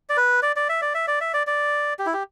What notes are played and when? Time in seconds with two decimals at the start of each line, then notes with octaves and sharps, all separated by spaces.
0.09 D5
0.17 B4
0.43 D5
0.56 D5
0.69 E5
0.82 D5
0.94 E5
1.08 D5
1.21 E5
1.34 D5
1.47 D5
1.99 G4
2.06 E4
2.14 G4